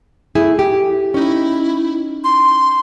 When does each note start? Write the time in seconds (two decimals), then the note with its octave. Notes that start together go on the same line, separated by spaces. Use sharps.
0.35 A3 E4 G#4
0.59 G4
1.14 C#4 D#4 E4
2.24 C6